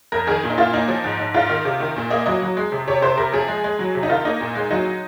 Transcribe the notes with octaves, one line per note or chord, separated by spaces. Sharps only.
F2 A#4
D#3 G#4
A#2
D#4
A#2 F4
A#3 D#4
F3
G#2
G#2
G#2 F4
D#3
C3
D#3
A#2
A#3 D#5
F#3 D#5
F#3
G#3
C3
C3 C#5
C3 C5
C3 A#4
F3 G#4
G#3
G#3
F#3
C3
D#4
D#3 F4
A#3 D#4
A#2
G#3
F#3 D#4